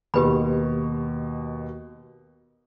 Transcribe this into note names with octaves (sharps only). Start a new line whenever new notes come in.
D#2 B2 G4 B4 B5